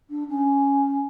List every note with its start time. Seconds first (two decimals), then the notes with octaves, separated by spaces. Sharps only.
0.09 D4
0.28 C#4